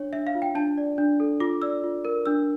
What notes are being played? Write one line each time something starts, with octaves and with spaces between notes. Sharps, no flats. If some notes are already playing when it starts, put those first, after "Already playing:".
Already playing: D4 C#5
D4 E5
F5
F4
G5
D4 A5
D5
D4
A4
F4 D6
D5 E6
F4
A#4
D4 E6